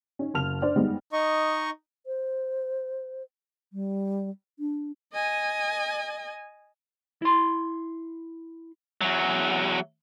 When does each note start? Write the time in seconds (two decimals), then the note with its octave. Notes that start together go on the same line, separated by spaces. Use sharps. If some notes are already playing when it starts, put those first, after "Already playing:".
0.19 C#4 D#4
0.34 F#1 A5 F6 F7
0.62 D4 C5 D5
0.76 G3 G#3 B3 D#4
1.13 D#4 D#5 C#6
2.06 C5
3.73 G3
4.59 D4
5.13 D#5 G#5
7.22 E4 C6
9.01 E2 F#3